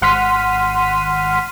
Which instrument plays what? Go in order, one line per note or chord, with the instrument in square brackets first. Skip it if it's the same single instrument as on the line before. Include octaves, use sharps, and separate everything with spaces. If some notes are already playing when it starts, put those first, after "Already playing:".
[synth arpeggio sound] G#1 F#5 C6 F6 B6 D#7